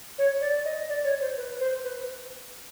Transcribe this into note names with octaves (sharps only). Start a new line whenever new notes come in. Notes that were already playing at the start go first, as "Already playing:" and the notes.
C#5
D5
D#5
D5
C#5
C5
B4
C5
B4